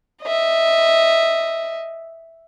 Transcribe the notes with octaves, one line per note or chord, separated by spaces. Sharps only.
D#5 E5